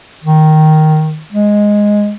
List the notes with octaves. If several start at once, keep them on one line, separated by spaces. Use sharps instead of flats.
D#3
G#3